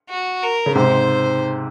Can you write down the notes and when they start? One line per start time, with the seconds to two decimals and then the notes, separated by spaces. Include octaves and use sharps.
0.10 F#4
0.43 A#4
0.66 C#3
0.75 G#2 C3 C5